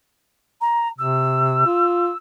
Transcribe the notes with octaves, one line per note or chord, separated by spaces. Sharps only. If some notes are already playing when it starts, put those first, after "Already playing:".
A#5
C3 E6
F4